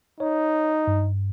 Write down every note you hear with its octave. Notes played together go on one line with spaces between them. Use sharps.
D#4 C#5
G2